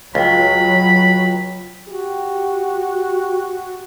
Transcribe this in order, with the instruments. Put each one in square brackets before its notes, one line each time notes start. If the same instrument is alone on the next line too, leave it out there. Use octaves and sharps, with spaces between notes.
[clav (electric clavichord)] C#2 [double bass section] F#3 [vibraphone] F4 G5 [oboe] B5
[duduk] F#4 [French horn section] G4